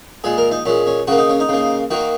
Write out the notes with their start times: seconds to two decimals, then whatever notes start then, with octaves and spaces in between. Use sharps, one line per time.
0.24 A#2 G#3 G#4
0.37 A#4
0.51 D#4
0.66 A#2 G#3 C#4
0.87 C#4
1.07 C#3 A#3 F#4
1.18 D#4
1.29 C#4
1.40 D#4
1.49 C#3 A#3
1.91 D#3 A#3 F#4